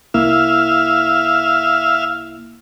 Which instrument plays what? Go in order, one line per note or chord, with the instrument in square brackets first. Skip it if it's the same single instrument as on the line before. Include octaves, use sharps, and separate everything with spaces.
[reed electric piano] C2 A#3 E4 [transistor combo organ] E5 F5